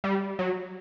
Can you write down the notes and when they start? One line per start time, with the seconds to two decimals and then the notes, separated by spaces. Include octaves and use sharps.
0.04 G3
0.39 F#3